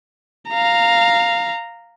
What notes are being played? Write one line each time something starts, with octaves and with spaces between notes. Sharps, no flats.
F5 A#5